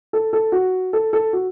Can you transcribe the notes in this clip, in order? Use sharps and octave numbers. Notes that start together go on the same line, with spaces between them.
A4
A4
F#4
A4
A4
F#4